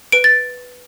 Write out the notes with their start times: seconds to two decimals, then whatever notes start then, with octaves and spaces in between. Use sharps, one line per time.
0.12 B4 D7
0.24 A6